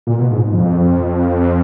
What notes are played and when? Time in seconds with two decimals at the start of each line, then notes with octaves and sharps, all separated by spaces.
0.07 A#2
0.19 B2
0.31 G#2
0.53 F2